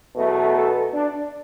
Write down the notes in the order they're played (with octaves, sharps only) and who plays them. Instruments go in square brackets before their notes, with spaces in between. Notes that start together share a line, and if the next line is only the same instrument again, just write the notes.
[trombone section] E2 B2 F#3 A3
A3 A4
D4